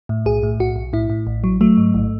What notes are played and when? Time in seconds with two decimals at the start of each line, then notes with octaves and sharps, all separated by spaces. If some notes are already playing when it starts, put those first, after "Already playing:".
0.09 A2
0.25 B1 G#4
0.43 A2
0.60 B1 F#4
0.76 B1
0.93 A2 E4
1.10 A2
1.27 A1
1.44 F#3
1.61 F#3 A3
1.77 G#2
1.94 A1